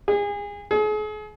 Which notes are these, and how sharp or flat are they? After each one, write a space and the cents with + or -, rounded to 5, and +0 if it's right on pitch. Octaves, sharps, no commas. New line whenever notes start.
G#4 -30
G#4 +40